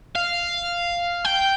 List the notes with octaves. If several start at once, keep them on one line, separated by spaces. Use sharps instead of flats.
F5
G5